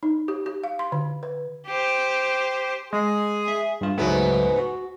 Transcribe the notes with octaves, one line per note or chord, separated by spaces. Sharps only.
D#4
G4
G4
F5
C6
D3
B4
G4 C5
G#3 G#4
E5
G2 F4
C#2 G#2 F#3 A3 B3
F#4